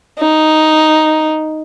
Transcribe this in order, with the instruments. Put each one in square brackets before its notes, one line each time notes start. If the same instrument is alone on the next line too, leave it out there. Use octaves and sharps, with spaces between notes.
[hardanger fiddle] D#4